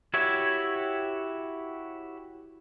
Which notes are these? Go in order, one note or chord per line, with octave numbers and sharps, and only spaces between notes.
E4 F#4 G4 C#5 E5